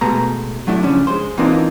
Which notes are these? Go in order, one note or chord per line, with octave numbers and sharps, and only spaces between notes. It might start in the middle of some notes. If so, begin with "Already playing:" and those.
B2 G#3 A3 B4 A5 A#5
F#3 A3 D4 E4
C#3 F3 C#4 D4
G#3 C5
E3 A#3 C4 D4 D#4 F4